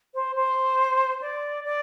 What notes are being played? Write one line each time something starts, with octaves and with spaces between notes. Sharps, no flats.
C5
C5
D5
D5